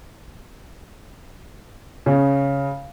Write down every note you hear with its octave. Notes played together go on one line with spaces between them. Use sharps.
C#3